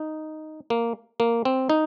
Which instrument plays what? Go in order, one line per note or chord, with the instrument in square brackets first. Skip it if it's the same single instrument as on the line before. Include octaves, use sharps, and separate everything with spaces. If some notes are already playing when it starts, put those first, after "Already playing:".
Already playing: [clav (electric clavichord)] D#4
A#3
A#3
C4
D#4